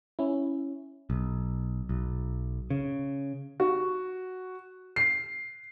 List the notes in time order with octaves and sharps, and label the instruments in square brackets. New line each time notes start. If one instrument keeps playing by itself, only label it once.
[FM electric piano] C#4 E4
[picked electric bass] B1
B1
C#3
[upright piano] F#4
C7